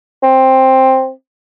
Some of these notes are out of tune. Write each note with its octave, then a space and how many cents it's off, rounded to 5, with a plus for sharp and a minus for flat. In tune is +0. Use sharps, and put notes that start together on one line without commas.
C4 +10